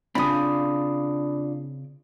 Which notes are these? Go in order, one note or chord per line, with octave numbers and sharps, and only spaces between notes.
C#3 C4 D4 F4 D5 B5 D#6